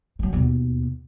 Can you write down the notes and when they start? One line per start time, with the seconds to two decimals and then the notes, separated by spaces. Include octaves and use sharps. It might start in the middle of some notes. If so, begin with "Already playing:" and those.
0.19 F3 F#3
0.33 D#2 B2